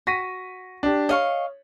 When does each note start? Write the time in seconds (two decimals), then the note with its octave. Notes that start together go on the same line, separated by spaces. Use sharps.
0.07 F#4 A#6 B6 D#7
0.83 D4 G4
1.09 C#5 D#5 F5 C#6